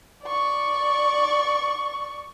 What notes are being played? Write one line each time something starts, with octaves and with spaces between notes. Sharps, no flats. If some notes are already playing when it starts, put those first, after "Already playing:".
D5 C#6